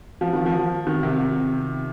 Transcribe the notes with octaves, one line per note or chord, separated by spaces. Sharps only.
F3
D#3
F3
D#3
C3
C3